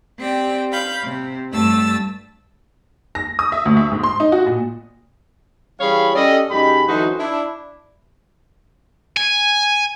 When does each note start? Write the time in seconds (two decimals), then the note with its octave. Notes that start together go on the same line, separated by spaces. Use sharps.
0.19 C4 G4 D5 G5
0.72 F5 B5 G6
1.05 C3
1.52 G2 G3 A3 A5 E6 A6
3.15 A#6
3.39 D#6
3.52 E5
3.65 D2
3.77 E5
3.92 G#2
4.03 C6
4.20 D#4
4.32 F#4
4.46 A#2
5.80 E3 G3 G#4 C#5 F5 B5
6.15 C#4 G4 A4 D5 D#5
6.50 F#2 G#3 D#4 G4 B5
6.88 D3 E3 F#3 D#4 F#4 C5
7.19 D4 E4
9.17 G#5